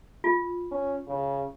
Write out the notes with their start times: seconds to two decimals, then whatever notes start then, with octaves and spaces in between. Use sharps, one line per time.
0.24 F4
0.71 C#4
1.08 C#3